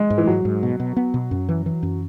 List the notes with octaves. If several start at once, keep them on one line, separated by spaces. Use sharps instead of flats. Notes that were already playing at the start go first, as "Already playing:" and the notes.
Already playing: G#3
G#2
E3
G#2 F#3
G#2
B2
B2
B3
B2
F#2
E3
E3
F#2